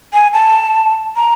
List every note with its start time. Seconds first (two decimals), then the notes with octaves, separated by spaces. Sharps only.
0.13 G#5
0.33 A5
1.16 A#5